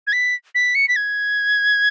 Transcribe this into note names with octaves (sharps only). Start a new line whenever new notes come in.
G#6
B6
B6
C#7
B6
G#6